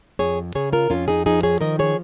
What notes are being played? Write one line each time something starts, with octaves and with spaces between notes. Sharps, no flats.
F2 G#4 C#5
C#3 G#4 C#5
F4 A#4
F2 C#4 F4
D#4 G#4
F3 D#4 G#4
G#4 C#5
D#3 A#4 D#5
G#4 C#5